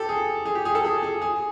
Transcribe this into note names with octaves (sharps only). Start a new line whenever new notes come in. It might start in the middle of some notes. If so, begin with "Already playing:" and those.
Already playing: G4 A4
G#4
G#4
G4
G#4
A4
G#4
G#4
G#4